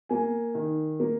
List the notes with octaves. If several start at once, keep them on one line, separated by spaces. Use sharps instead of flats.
A#3 G#5
D#3
A#3